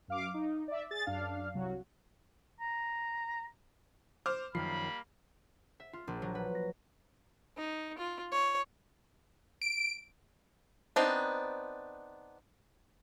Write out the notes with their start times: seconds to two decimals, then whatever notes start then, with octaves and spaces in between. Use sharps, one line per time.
0.08 F#2 F5 D6
0.34 D#4
0.68 D5 E5
0.91 G#4 A6
1.06 F#2 D4 F5
1.54 C2 F#3 F#4
2.61 A#5
4.26 C5 D6 F6
4.55 F#2 D#3 F3 G3 A#3 B5 C7
5.80 E5
5.93 F4
6.07 A#1
6.22 F#3
6.35 B4
6.55 A#6
7.58 D#4
7.98 F4
8.32 C#5
9.62 D7
10.96 B3 C4 D4 D#4